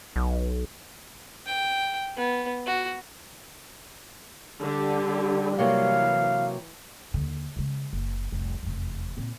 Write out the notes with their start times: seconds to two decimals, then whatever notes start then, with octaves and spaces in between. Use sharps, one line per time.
0.16 B1
1.46 G5
2.16 B3
2.66 F#4
4.60 D3 G3 G4
5.59 C3 E3 F#3 A#3 F5
7.14 D#2 D3
7.56 C#3 G#3
7.93 F#1
8.32 F1 C2
8.63 F1 E2
9.17 A#2 C4